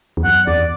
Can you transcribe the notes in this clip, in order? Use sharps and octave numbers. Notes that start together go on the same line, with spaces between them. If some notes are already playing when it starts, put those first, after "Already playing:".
E2
F#2 F#5
E2 D5